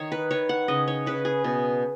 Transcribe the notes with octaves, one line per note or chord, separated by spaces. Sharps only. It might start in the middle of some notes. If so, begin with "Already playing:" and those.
Already playing: D#3 C#5
B4
D#3 C#5
F#5
C#3 D#5
C#5
C#3 B4
G#4
B2